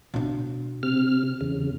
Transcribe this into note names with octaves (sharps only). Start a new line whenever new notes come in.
B2 D4
C3 F6
E2 C#3